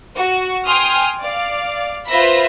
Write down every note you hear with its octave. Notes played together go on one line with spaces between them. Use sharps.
F#4
G5 G#5 C6 D#6 F6
D5 F5
F4 B4 C5 E5 B5 A#6